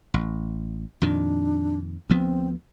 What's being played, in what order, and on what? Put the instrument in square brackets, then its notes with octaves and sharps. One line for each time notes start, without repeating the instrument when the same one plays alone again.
[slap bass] A1
[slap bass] F2 A#2 D#3 [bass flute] D4
[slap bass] D2 F3 B3 [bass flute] C4